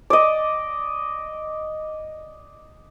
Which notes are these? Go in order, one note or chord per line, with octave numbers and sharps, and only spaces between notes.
D5 D#5